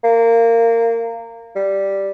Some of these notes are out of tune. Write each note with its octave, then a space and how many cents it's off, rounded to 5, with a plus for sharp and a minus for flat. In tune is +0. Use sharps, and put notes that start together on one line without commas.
A#3 -20
G3 +0